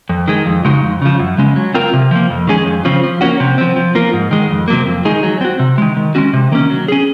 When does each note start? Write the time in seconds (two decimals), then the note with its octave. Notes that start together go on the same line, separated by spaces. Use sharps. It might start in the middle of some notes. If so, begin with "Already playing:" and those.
0.09 F2
0.28 D#3 G#3
0.46 F2
0.65 C#3 G#3 D#4 F#4
0.84 F2
1.02 C#3 F3
1.20 F#2
1.38 C#3 G#3 C#4
1.56 F#3
1.74 C4 F4 A#4
1.93 C3
2.11 F3 A#3
2.30 F2
2.47 D#3 G#3 C#4 G#4
2.66 F2
2.85 C#3 F3 C4
3.03 F3
3.21 A#3 C#4 F#4
3.40 C3
3.58 F3 C4
3.76 F3
3.95 A#3 F4 A#4
4.13 G#2
4.31 D#3 G#3
4.50 F2
4.68 C3 F#3 A#3
4.86 F2
5.05 D#3 G#3 D#4 G#4
5.23 F#3
5.41 C4 F#4
5.59 C3
5.78 D#3 G#3
5.97 D#3
6.15 G#3 C#4 F#4
6.33 C3
6.52 D#3 A#3 C#4
6.70 F#3
6.88 C#4 G#4